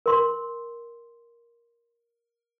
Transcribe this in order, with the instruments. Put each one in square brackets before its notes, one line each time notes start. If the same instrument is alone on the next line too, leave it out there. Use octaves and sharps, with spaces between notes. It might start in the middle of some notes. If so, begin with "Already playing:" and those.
[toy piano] A#4 C6